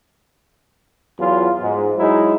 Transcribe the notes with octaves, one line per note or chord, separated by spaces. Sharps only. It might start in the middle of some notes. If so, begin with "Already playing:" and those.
E2 F#3 F4
G#2
F#3 G#3 D#4 E4